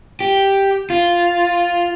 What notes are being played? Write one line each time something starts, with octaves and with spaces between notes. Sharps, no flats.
G4
F4